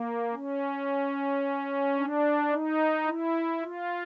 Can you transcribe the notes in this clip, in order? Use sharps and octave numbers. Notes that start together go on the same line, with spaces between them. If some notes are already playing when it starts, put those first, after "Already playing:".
Already playing: A#3
C#4
D4
D#4
E4
F4